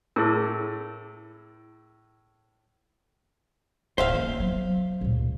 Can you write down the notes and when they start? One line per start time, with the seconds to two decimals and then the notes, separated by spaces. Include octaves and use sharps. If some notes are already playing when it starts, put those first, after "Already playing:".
0.16 A2 E4 G#4 A#4
3.98 D1 C5 E5 F5
4.13 A#3 C#4
4.40 F#3 B3
5.01 C#2 A#2